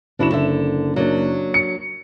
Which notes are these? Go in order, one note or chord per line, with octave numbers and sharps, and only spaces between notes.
F#1 D4 E4 F#4 E7
D3 E5
F#3 A#3 D4
C#7